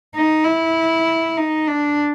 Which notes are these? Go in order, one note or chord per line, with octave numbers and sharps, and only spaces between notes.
D#4
E4
D#4
D4